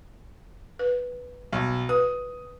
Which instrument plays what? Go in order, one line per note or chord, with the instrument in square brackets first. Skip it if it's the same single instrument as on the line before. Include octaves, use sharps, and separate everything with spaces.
[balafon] B4
[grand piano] B1
[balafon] B4 [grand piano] D#6